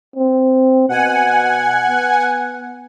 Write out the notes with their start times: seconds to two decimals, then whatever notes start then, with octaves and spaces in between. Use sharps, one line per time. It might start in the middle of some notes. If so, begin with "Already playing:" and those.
0.16 C4
0.89 B2 F#5 G#5
1.88 B3